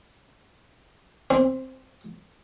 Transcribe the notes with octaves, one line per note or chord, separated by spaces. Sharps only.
C4